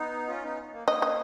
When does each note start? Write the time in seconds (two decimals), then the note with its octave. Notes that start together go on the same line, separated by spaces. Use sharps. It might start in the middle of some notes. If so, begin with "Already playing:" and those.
Already playing: B3 D#4
0.27 C#4 F4
0.43 B3 D#4
0.73 A#3
0.88 A#3 D#5
1.02 D#5